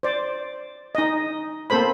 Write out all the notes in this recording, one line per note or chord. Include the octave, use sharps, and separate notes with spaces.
C5 D5
D#4 D#5
A#3 C4 A4 C5 B5